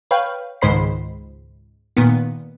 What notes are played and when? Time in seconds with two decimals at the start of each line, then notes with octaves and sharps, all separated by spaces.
0.11 B4 C#5 F5 G5
0.62 C#2 G#2 D#3 C5 B5 C7
1.97 A#2 D#3 B3